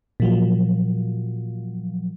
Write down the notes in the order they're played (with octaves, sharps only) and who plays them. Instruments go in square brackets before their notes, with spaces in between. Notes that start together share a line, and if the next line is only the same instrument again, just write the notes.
[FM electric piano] A#2 F3 F#3